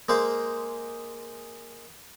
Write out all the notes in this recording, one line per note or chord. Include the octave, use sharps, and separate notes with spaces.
G#3 A#3 C5 F5